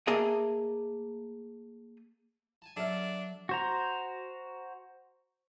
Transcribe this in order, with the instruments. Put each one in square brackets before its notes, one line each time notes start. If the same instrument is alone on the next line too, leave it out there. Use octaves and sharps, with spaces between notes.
[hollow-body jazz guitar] A3 A#3 G#4 D#5 E5
[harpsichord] G#5 A5
[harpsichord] F#3 [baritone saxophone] D4 [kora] A4 E5 F5
[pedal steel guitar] F#4 C5 A#5